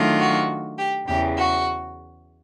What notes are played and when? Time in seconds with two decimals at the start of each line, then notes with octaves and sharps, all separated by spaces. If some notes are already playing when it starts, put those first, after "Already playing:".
Already playing: D#3 F#3 A3 D4 F4
0.20 F#4
0.78 G4
1.07 E2 C#3 E3 G4
1.36 F#4